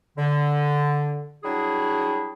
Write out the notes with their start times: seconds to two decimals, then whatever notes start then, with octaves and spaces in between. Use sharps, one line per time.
0.17 D3
1.43 F#3 G3 D4 E4 G#4